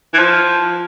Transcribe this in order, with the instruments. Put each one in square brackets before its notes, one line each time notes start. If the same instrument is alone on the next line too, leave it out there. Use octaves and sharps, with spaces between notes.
[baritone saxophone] E3
F3